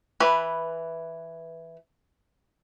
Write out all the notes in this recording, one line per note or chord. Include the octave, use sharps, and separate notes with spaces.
E3 B4